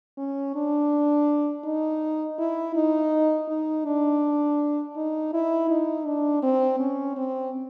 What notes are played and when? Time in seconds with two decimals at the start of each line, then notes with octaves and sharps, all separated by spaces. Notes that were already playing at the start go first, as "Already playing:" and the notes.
0.17 C#4
0.55 D4
1.64 D#4
2.39 E4
2.76 D#4
3.49 D#4
3.85 D4
4.96 D#4
5.33 E4
5.70 D#4
6.06 D4
6.43 C4
6.80 C#4
7.17 C4